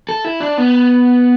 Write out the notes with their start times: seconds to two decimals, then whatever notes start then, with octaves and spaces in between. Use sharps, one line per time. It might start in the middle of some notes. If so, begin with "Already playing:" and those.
0.09 A4
0.25 E4
0.41 D4
0.58 B3